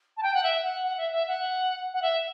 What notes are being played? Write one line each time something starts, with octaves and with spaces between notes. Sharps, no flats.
A5
G5
F#5
E5
F#5
F#5
E5
E5
F#5
F#5
E5